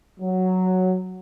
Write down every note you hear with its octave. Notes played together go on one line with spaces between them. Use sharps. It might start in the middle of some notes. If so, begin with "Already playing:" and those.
F#3